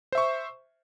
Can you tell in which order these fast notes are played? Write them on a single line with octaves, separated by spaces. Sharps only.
C5 E5 C#6